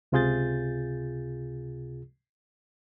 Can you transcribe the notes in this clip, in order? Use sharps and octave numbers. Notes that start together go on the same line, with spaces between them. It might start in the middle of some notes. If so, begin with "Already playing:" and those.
C#2 C3 F4 G#4 G6 A6